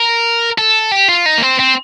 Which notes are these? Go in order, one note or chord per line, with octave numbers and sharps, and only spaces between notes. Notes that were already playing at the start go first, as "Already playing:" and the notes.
Already playing: A#4
A4
G4
F4
D#4
A#3
C4
C4